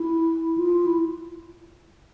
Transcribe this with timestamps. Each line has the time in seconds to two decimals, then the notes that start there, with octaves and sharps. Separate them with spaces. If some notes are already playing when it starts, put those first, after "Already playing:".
Already playing: E4
0.58 F4
0.86 E4